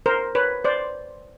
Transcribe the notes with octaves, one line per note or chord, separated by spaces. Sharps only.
A#4 C5
B4 C#5
C5 D5